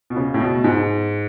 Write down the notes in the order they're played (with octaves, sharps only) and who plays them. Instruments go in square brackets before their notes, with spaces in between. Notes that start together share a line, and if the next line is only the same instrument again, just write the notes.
[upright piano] B2
C#3
A2
B2
G#2